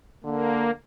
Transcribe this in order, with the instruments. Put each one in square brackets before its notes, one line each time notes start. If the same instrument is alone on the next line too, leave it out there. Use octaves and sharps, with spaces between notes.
[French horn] D3 [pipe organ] A#3